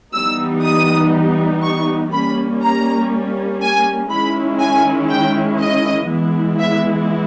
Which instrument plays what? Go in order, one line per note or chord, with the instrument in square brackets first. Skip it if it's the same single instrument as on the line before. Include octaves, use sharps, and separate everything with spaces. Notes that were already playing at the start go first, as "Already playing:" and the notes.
[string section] E3 G3 B3 D#4 E6
D#6
C#6
G3 A#3 C#4 B5
A#5
G#5
D#3 G#3 C#4 E4 B5
G#5
G5
D#5
E3 G#3 B3 E4
E5